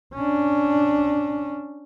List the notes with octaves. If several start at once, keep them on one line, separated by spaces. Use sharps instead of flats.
C#4 D4